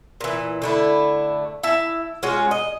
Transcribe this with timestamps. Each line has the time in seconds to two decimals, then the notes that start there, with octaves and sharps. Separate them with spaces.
0.21 A#2 E3
0.62 D3 A3 E4
1.64 E4 E5 A5
2.23 G#3 C#4 F4 F#4
2.51 D#5